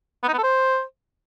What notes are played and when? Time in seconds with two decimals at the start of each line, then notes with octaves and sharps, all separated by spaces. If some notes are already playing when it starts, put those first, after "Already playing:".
0.23 B3
0.28 D#4
0.33 B3
0.38 A4
0.44 C5